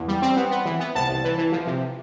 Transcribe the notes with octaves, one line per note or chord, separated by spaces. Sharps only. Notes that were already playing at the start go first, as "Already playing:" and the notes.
Already playing: E2
G3
C4
B3
B3
E3
B3
C2 A5
C2
E3
E3
F3
C3